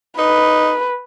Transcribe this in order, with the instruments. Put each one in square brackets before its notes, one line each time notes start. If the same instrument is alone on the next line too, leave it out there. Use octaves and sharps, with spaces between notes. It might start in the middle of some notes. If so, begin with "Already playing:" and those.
[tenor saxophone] D#4 [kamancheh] B4